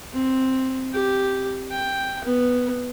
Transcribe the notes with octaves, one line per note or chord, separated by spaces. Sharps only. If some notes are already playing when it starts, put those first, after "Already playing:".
C4
G4
G5
B3